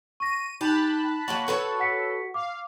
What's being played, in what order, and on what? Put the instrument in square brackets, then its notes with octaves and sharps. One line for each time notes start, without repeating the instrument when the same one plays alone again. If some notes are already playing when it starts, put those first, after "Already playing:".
[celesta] C#6 A#6 [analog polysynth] D#7
[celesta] D#4 [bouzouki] G4 [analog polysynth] A5 B5 F#6
[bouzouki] F#3 A#3 F#4 [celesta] F#7
[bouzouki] F#4 B4 C#5 [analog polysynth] A4
[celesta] F#5 B6 C#7
[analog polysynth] F5 [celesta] D6